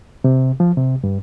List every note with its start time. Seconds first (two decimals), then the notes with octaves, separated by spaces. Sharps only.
0.24 C3
0.60 F3
0.77 C3
1.04 G2